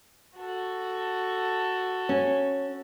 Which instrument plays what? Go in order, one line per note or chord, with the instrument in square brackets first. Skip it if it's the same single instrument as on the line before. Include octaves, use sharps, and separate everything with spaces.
[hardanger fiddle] F#4 A4
[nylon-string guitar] C#4